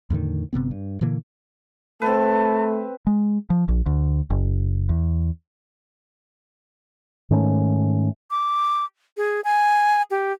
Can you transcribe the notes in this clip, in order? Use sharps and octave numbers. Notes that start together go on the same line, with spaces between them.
E2 A2 D3 D#3
G1 C3 B3 C4
G2
A#2 D3 E3 A#3
A3 C4 B4 A5
G#3
F3
A#1
D2
F#1
E2
G#2 D#3 A3 C#4
D6
G#4
G#5
G4